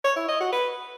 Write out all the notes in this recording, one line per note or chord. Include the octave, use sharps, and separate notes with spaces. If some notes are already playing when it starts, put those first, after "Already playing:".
C#5
E4
D#5
F#4
B4